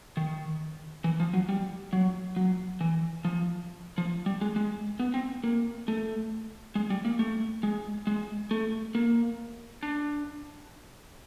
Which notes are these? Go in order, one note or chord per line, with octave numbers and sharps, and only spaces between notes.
D#3
E3
F3
F#3
G3
F#3
F#3
E3
F3
F3
G3
G#3
G#3
B3
C4
A#3
A3
G#3
G3
A#3
A3
G#3
G#3
A3
A#3
D4